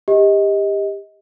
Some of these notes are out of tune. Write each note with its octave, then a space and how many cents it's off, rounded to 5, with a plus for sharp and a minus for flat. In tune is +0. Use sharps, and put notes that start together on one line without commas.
G4 +25 D#5 +20